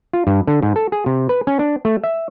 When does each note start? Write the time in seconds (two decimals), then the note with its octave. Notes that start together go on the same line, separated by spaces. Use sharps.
0.13 F4
0.27 G2
0.47 D3
0.63 G#2
0.76 A4
0.92 G#4
1.06 C3
1.29 B4
1.47 C#4
1.59 D4
1.85 A3
2.04 E5